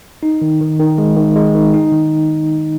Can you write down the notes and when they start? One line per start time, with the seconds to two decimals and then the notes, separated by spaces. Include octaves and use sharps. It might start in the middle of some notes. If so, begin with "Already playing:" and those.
0.23 D#4
0.42 D#3
0.61 D#3
0.80 D#3
0.98 G#3
1.17 D#3
1.36 G#3
1.54 D#3
1.74 D#4
1.92 D#3